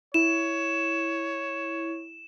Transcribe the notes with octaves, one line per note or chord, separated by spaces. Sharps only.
E4 C#5 E7